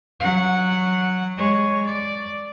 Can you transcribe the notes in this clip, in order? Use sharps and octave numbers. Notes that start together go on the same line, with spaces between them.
F#3 F#5
G#3 C#5
D5